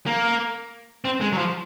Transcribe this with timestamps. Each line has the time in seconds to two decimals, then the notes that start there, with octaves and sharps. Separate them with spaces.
0.06 A#3
1.05 C4
1.21 G#3
1.32 F#3
1.38 F3